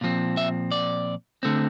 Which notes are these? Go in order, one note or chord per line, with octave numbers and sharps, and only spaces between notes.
A#2 F3 C4
E5
D5
D3 A3 C4